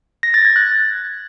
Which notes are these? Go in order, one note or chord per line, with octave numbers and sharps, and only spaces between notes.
A#6
A6
G#6
F#6